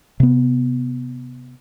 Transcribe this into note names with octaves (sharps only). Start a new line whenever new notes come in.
C3 B3